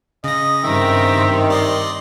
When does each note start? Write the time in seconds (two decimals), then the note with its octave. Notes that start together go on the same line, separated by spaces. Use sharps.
0.24 C#3 D#5 A#6
0.63 G2 D#3 C4 G4 E5
1.50 D5 D#5 C6